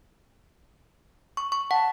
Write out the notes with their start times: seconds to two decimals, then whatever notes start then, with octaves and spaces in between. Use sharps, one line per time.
1.37 C#6
1.52 C#6
1.71 F#5 A5